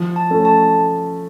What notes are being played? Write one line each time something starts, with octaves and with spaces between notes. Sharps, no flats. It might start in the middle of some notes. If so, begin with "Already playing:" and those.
Already playing: F3
A5
A3 C#4
A5